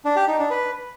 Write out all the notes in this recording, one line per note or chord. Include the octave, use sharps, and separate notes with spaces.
D4
G4
D#4
D4
B4